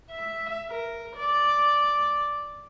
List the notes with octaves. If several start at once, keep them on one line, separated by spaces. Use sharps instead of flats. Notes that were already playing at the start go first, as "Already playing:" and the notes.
E5
A#4
D5